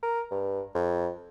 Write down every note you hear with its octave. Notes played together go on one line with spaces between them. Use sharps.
A#4
G2
F2